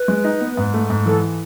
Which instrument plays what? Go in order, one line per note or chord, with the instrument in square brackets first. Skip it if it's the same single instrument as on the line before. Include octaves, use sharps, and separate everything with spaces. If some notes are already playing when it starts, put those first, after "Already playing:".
Already playing: [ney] B4
[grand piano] G#3
D#4
B3
G#2
A3
G#2
[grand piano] E3 [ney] A4